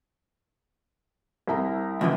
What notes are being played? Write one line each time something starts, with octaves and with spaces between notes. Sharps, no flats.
C2 E5 A#5
C#2 F#2 E3